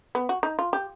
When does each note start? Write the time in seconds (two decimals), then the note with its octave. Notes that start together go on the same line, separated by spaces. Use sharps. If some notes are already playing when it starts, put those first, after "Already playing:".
0.15 B3
0.29 F#4
0.43 D#4
0.59 F4
0.73 G4